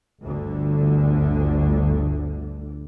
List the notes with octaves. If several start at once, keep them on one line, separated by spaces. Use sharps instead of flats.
G1 D2 D3